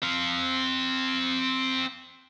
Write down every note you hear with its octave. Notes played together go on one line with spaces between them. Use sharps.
C4 F5